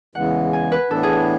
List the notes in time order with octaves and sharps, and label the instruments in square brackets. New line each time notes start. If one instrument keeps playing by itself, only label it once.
[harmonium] E2 C#3 E3 G#3 [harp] F#5
[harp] G#5
B4
[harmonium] A2 E3 B3 D4 [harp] A4
[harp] G#4